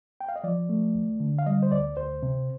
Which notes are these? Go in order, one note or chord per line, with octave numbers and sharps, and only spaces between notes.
G5
F5
D#5
F3 D5
A3
D#2
D3
F5
G3 D#5
C5
D2 D5
D2 C5
C3